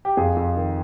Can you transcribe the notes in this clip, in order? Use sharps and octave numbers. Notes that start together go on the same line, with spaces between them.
G4
F2 G#4
F2
D#3